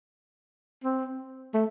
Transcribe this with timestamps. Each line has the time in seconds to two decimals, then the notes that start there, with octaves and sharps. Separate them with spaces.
0.84 C4
1.54 A3